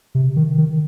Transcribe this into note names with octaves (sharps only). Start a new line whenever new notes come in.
C3
D#3
D#3